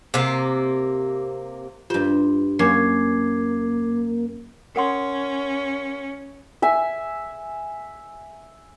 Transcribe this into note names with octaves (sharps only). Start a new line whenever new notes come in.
C3 A#3
G2 F4 G4 C5
F#2 A#3 C#5 D6 G#6 C7
C#4 A#4 F#5 C6
E5 G#5